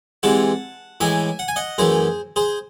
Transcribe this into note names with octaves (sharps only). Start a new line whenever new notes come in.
C3 E3 G#3 F#5 A5
A2 E3 G#3 E5 G#5
F#5
G#5
D#5 F#5
F#2 E3 A3 G#4 C5
G#4 C5